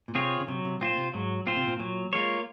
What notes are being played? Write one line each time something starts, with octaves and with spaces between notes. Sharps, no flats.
A#2
C3 C4 F4 G#4 C#5
C#3
C3 F#3
C3
A#2 C4 F4 C5
C3
G#2 F#3
A#2 C4 F4 C5
C3
A#2
A#2 F#3
G#3 A#3 F4 A#4 C#5